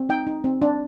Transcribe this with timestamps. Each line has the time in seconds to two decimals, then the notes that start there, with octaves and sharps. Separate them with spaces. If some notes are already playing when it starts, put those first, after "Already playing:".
Already playing: C4
0.09 D#4 G5
0.27 D#4
0.44 C4
0.62 D4